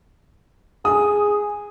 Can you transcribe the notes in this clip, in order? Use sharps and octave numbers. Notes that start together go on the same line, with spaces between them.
G#4 D#6